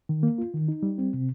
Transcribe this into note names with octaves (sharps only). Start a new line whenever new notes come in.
D#3
A#3
F4
D#3
D#4
G3
C4
C3